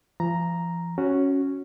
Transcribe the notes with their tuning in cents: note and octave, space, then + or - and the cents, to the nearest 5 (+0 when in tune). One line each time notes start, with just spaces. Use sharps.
F3 -35 A#5 +0
C#4 +0 F#4 +0